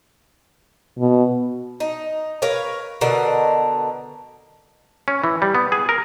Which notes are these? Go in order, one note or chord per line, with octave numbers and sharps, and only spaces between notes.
B2
D#4
A#4 B4 C#5 F5
B2 D3 A#4 F#5
C#4
E3
G3
B3
G#4
A#4